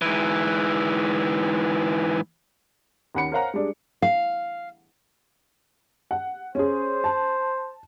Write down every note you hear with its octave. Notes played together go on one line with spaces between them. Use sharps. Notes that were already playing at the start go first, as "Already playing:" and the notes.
G#2 E3
D#2 C#4 F#5 B5 C#7
A#4 C5 C#5 F5 F#5 A#5
G3 G#3 D4
F5
F#5
C#4 G#4 C5
A5